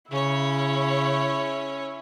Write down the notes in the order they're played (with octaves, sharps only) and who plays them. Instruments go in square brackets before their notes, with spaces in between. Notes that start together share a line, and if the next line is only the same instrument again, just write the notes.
[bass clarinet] C#3 [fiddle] C#4 C#5 [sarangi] E4